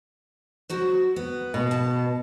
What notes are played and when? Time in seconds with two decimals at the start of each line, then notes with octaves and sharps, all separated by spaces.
0.70 F#3 F#4 C5
1.16 B3
1.54 B2
1.71 A5